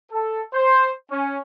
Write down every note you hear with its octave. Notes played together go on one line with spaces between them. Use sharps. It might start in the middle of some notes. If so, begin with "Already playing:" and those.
A4
C5
C#4